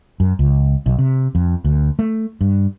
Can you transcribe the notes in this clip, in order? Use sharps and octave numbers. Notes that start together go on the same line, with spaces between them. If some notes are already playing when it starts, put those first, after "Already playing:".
F#2
C#2
B1
C3
F2
D2
A3
G2